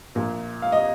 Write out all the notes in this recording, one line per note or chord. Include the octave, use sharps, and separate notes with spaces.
A#1 A#2
F5
D#5